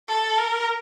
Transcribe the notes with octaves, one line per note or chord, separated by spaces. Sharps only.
A4
A#4